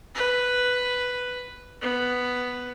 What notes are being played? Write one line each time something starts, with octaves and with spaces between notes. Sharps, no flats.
B4
B3